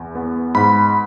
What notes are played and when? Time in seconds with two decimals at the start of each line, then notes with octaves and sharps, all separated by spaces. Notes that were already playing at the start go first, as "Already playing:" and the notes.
Already playing: E2
0.15 B3
0.55 G#2 B5